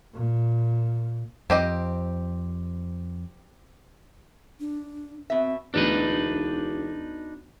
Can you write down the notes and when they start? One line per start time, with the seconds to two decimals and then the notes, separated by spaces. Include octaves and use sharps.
0.14 A#2
1.50 F2 C4 G4 D#5
4.60 D4
5.30 B2 C4 E5
5.74 E1 D2 B3 D4 D#4 B4